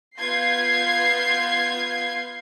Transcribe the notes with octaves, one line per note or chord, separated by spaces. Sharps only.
B3 F4 G6 G#6 C7